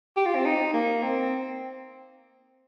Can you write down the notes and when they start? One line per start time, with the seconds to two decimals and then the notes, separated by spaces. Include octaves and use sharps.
0.17 G4
0.26 F4
0.35 C4
0.45 D#4
0.73 A#3
1.03 C4